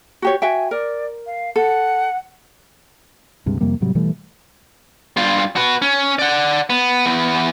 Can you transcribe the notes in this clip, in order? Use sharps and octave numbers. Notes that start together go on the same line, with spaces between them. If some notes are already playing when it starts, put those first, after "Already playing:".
F#4 G4 C#5
F#4 E5 G5 G#5
A#4 D5
F5
A4 F#5
C#2 G2 C3 G#3
F2 C3 G3 A#3
G#2 C3 F#3 G3
B2 E3 G3 A3
G2 F4
F#4 B4
C#4
D5 F#5
B3
E3 B3